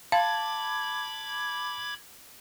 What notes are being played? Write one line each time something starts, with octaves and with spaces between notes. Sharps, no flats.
F5 A5 B5 D6 G#6